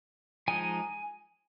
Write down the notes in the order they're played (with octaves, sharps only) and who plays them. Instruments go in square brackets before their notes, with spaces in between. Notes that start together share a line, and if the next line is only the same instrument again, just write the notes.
[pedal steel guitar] F3 G#3 D#4 G#5